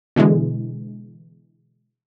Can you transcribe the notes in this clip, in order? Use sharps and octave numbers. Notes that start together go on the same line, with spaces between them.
B2 D3 E3 G#3